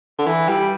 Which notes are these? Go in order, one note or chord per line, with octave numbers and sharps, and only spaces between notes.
D3
E3
G3